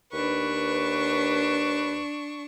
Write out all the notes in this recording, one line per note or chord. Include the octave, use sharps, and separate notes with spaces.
D#2 D4 B4 C#6